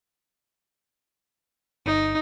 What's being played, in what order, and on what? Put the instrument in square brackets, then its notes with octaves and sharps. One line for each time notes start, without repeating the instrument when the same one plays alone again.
[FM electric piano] G1 [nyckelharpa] D#4